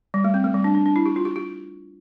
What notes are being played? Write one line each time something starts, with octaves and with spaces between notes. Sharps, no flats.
G3
A3
C4
A3
G3
D4
D4
D4
E4
G4
F4
G4
G4